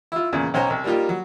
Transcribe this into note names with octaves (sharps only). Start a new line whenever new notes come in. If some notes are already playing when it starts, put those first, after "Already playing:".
E4 F4
E2 A#2 C#3
B1 C#4 C5 D#5 A#5
C2
G3 A#3 D#4 F4 G4
F#3